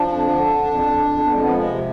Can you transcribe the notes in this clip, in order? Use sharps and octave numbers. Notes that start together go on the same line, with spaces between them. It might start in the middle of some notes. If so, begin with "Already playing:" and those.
Already playing: F3 D4
F2
D3
D3
F2
F2
F2
F2 B3
G#3
F3 B3
G#3
C3